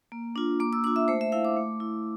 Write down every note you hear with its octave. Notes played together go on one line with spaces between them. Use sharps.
A#3
D4 F4
A#3 D6
E6
D4 F4 D6
E5
A3 C5
E5
E4 F5
D6
A3
E4